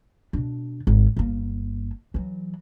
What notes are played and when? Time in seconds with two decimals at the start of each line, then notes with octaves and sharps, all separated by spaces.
0.33 B2 D4
0.87 G#1
1.17 G1 A#3
2.14 E3 F#3